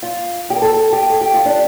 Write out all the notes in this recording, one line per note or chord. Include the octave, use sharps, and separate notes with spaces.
F4
G4
A#4
A4
A4
G4
A4
G4
F4
D4